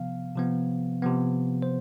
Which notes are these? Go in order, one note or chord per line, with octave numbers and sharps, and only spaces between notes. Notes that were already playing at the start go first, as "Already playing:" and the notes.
Already playing: C3 F3 B3 F5
C3 F3 B3
C3 F3 B3
C5